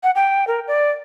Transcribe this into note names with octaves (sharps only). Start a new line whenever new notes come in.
F#5
G5
A#4
D5